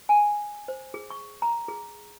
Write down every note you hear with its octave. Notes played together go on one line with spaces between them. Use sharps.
G#5
C5
G#4
C#6
A#5
G#4